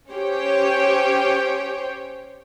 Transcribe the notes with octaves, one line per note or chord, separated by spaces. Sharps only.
C#4 G4 C5 C#5 G5